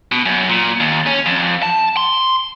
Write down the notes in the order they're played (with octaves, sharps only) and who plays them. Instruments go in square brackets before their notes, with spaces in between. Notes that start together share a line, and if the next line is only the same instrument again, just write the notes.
[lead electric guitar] B2
F#2
A#2
D#2
C#4
F2
A5
C6